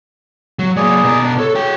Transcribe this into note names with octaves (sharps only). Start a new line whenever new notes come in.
F#3
F#3 A#3 G#4 D5
B2 A#4
D4
A4 C#5
F#4 G5